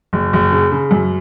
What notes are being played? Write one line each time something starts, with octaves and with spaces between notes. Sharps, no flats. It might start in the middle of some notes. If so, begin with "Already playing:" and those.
F#1
F#1
C#3
C#3
F#2